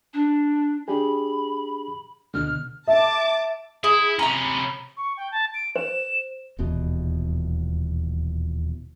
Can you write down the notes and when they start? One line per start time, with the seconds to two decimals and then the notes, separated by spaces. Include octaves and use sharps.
0.13 D4
0.88 D4 G4 G#4 B5
2.34 D2 B2 D3 F6
2.88 E5 A5 D6
3.84 E4 G#4
4.19 C3 C#4 A#5 B5
4.97 C#6
5.17 G5
5.31 A5
5.54 D7
5.76 C5 E7
6.59 D#1 E2 B2